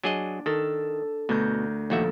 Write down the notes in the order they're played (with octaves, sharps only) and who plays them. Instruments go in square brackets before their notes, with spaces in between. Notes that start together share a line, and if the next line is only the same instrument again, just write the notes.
[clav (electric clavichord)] F#3 G#4 D#5 [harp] D4
[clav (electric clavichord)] D#3 [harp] A4
[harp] D2 A#4 G6 [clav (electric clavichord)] B2
[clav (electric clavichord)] D#2 F#4 E5 [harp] A#2 F3 A4